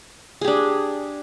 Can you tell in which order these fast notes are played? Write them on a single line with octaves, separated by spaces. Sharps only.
G#4 G4 D4